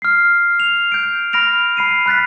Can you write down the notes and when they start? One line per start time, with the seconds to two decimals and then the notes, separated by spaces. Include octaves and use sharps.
0.02 F6 C7
0.60 F7
0.92 G6 D7
1.33 B5 F6 A#6 D7 F7
1.77 B5 C7 D#7
2.06 B5 F#6 A6 B6